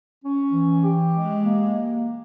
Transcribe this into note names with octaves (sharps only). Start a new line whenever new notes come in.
C#4
E3
G4
G#3
A#3